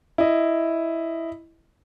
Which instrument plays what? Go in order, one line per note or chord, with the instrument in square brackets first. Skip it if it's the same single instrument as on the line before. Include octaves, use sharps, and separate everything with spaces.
[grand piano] E4 D#5